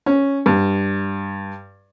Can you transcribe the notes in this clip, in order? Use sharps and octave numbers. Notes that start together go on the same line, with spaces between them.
C#4
G2